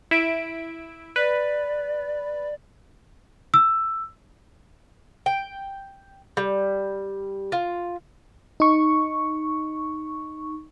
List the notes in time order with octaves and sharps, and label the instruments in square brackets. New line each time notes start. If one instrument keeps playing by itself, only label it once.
[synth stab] E4 E5 D7
[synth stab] B4 [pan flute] D5
[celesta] E6
[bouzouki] G5
G3
F4
[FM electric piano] D#4 C#6